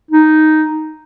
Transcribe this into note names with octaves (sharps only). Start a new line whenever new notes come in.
D#4